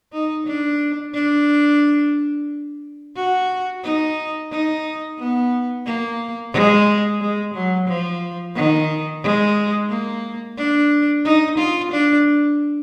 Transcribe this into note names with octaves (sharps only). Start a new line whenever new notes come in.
D#4
D4
D4
F#4
D#4
D#4
B3
A#3
G#3
G#3
F#3
F3
D#3
G#3
A#3
D4
D#4
F4
D4